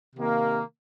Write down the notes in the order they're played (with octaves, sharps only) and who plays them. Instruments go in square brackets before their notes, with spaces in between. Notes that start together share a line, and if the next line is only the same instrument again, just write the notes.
[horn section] C3 D#3 A#3